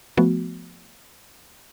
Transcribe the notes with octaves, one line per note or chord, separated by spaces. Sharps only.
F3 A3 B3 F#4